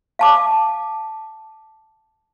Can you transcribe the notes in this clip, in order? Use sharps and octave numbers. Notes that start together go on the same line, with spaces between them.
F5 A5 D6